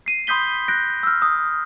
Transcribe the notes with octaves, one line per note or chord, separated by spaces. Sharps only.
C7 D#7
B5 C6 D#6 G6 B6 G7
F#6 G6 A#6 D7
E6 F6
D#6